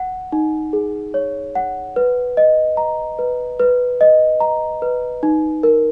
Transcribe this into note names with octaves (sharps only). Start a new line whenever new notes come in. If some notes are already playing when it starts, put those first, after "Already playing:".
Already playing: F#5
D#4
G#4
C#5
F#5
B4
D#5
A#5
B4
B4
D#5
A#5
B4
D#4
A#4